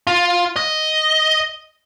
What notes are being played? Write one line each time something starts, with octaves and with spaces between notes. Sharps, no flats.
F4
D#5